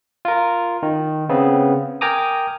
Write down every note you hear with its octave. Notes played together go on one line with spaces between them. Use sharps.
F4 A#4
D#3
C#3 B3 C4
A#4 G5 G#5 A#5 D6 D#6